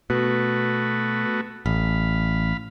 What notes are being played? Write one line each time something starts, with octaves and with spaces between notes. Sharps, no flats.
B2 A3 B3 F#4
A1 F5 B5